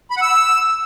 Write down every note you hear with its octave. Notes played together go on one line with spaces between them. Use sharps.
B5
F#5
E6